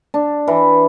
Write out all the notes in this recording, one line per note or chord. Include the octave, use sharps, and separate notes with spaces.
D4
E3